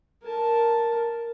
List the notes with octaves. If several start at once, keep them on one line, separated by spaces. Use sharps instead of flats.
A#4 A5